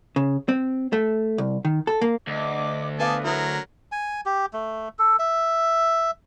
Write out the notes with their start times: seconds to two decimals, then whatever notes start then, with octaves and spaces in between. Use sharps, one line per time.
0.16 C#3
0.49 C4
0.93 A3
1.38 C2
1.65 D#3
1.87 A4
2.01 A#3
2.27 D2 D#5 D6
2.99 B3 A4 B4 F5 G#5 D6 D#6
3.25 F#3 E4 A#4
3.92 G#5
4.26 G4
4.53 A3
4.99 A4
5.19 E5